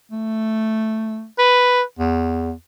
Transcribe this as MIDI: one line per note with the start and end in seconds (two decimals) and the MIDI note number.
0.11 1.25 57
1.39 1.82 71
1.99 2.52 40